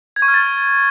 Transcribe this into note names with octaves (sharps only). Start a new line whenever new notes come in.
G#6
C#6
F6
A6